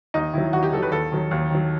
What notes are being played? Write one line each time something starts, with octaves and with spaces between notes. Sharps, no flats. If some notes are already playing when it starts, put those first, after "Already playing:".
D#2 D#4
D#3 F#3 E4
D#2 F#4
G4
D#3 F#3 A4
B4
D#2 A4
D#3 F#3
D#2
D#3 F#3